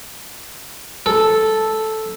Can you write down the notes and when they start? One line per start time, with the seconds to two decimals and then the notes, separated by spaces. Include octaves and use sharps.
1.06 A4